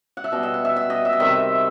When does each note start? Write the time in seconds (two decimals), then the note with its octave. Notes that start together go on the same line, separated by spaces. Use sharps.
0.17 F#5
0.24 E5
0.32 B2 G3 D#5
0.43 E5
0.54 F#5
0.65 E5
0.76 E5
0.90 D#5
1.05 E5
1.13 D#5
1.20 C3 D#3 G3 E5